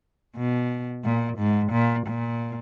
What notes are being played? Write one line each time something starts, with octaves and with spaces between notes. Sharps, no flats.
B2
A#2
G#2
A#2
A#2